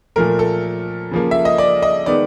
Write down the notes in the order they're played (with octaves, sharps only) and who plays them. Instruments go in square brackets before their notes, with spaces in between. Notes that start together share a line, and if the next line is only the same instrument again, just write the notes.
[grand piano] A#2 F3 A3 A#4
A4
C#3 F3 A#3
E5
D#5
D5
D#5
D#3 G#3 B3 D5